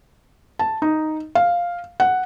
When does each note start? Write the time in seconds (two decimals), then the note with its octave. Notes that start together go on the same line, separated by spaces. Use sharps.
0.59 A5
0.82 D#4
1.35 F5
2.00 F#5